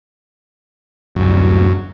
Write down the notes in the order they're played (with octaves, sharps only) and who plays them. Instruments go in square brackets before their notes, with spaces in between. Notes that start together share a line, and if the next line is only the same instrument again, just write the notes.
[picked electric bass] D1 C2 [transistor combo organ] F#2